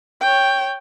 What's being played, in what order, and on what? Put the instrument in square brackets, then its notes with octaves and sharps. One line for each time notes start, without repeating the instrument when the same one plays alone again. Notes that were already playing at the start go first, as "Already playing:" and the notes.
[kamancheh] C#5 G5